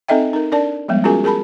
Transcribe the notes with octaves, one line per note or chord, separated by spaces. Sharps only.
C4 D#4 A4 D#5 E5 G5
D#4 A#4
D4 A#4 D5 A5
F3 G3 G#3 B3
C#4 F4 F#4 G#4 A#4 G#5
G#4 A#4 A5 B5